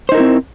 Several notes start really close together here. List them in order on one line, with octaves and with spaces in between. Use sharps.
C5 D#4 A#4 E4 C4